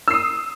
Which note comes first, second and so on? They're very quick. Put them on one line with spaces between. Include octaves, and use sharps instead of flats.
E6 C7 D#6